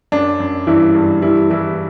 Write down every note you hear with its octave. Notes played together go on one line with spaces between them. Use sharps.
F#2 D4
F#2
G2 E3 E4
G2
E3 G3 E4
E3 G3 E4